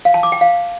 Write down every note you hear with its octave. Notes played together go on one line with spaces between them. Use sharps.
F5
A5
D6
G5
F5